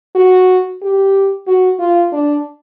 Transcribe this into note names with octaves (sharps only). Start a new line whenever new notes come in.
F#4
G4
F#4
F4
D4